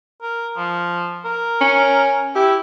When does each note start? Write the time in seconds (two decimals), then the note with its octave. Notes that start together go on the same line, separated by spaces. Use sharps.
0.22 A#4
0.57 F3
1.25 A#4
1.61 C#4
2.35 E4 G4